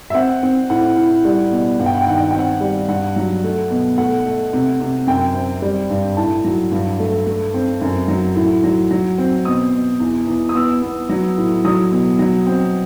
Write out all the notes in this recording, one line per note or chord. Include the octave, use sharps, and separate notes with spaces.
E5
C4 F#5
C4
A2 F#5
A2
G3
B2
G2 F#5
G5
F#5
G5
D#3 F#5
G5
F#5
G5
C4 F#5
G3
G2 F#5
F#3
A3
B2
A3 F#5
A3
C3
C3
F#2 G5
C4
G3
G2
A2 A5
F#3
G2
A3
A3
C4
F#2
F#3
A2
F#3
F#3
C4
B2 D#6
B2
E2
E2
D#6
B3 E6
B3
F#3
A2
F#3 D#6
B2
F#3
C4